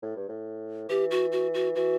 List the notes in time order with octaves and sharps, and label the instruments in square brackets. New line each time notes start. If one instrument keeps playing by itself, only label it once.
[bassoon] A2
G2
A2
[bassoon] E3 [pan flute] G4
[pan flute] F#4
F#4
F#4
[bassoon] E3 [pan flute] F#4